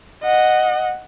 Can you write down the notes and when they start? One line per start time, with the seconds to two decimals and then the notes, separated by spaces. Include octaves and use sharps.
0.24 D#5 F#5